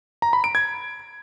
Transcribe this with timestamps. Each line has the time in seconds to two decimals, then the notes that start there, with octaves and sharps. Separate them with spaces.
0.22 A#5
0.33 B5
0.44 D7
0.55 G#6